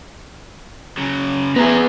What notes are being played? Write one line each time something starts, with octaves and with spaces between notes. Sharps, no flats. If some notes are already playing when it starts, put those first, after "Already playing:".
C#3 F#3
B3 G#4 E5 A#5